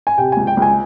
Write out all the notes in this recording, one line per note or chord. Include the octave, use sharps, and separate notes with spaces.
G#5
C3 G5
C#2 G#5
G5
C#2
G#5